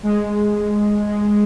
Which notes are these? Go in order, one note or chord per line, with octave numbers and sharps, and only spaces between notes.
G#3
G#3
G#3